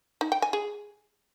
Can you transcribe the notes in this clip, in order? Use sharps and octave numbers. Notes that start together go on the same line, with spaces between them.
D#4
G5
G#5
G#4